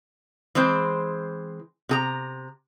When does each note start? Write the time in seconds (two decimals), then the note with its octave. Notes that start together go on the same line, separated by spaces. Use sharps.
0.55 E3 G#3 C4 C5
1.89 C3 G#4 A#5